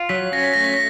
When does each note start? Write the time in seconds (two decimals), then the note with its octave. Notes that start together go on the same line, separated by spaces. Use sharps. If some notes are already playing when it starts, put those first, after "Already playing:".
Already playing: F4
0.09 F#3 B6
0.32 C#4 A#6
0.43 B6
0.54 A3 A#6
0.64 B6
0.74 A#6